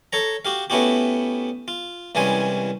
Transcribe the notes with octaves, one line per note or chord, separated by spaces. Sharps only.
A4 C#5 A#5
F#4 G4 F5
A3 B3 C#4 E4 F#4 G4
F4
C2 E3 G3 G#3 C#4 G#5